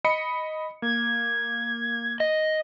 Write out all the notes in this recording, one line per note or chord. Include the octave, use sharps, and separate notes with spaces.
D#5 B5 C#7
A#3 G#6
D#5